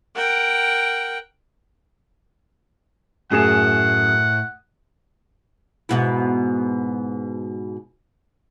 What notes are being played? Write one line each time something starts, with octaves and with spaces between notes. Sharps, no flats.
A#4 F#5 G5
F#2 A2 G#4 F#5 E7
G#2 B2 E4